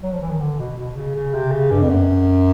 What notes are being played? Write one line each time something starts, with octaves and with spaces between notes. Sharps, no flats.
F#3
F3
E3
D#3
D3
B2
B2
C#3
C#3
C3
C#3
G2
F2
F#2